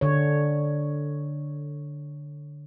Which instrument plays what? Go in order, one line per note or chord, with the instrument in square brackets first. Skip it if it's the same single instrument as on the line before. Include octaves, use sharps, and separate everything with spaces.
[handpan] D3 C#5